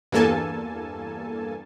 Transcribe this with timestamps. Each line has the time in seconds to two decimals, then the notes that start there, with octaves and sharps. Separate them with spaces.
0.12 E2 G2 A#3 A4 G#5 A5